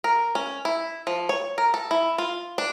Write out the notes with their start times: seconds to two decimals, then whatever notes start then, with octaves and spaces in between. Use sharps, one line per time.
0.04 A#4
0.35 C#4
0.65 E4
1.07 F3
1.29 C#5
1.58 A#4
1.74 A4
1.91 E4
2.18 F4
2.58 D4